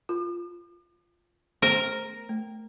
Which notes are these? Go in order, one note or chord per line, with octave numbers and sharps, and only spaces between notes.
F4
A3 B3 A#4 C5
A3